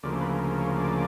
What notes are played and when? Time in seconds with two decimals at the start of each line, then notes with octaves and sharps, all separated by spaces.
0.03 D2 C#3 F3 A#3 D5
0.21 B4
0.59 C#5
0.78 D5